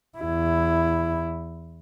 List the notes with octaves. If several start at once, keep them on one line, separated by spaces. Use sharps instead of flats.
E2 E4